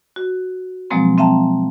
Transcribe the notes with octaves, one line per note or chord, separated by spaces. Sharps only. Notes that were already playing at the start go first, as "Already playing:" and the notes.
F#4
B2 F3 F#3 G#3 A#3 C4
C4 E5 F5 G5 A5 A#5